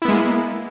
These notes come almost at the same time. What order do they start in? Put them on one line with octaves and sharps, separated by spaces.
E4 B3 G#3 A#3